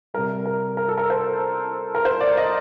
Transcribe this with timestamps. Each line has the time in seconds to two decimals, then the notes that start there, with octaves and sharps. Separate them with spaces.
0.14 C3 G3 A#4
0.46 A#4
0.77 A#4
0.88 A4
0.98 A#4
1.10 C5
1.95 A#4
2.05 C5
2.21 D5
2.37 D#5